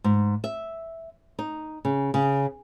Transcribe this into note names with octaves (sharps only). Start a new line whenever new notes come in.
G#2
E5
D#4
C#3
C#3